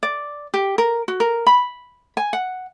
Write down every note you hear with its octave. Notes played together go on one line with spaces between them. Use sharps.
D5
G4
A#4
F#4
A#4
B5
G#5
F#5